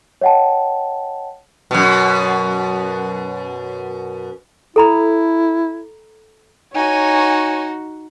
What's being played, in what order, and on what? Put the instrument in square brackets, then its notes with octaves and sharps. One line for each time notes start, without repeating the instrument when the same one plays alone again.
[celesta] C#5 D#5 F#5 G5 A5
[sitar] F#2 B2
[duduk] E4 [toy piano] A4 A#5 B5
[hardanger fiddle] D#4 F#4 [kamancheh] C#5 G#5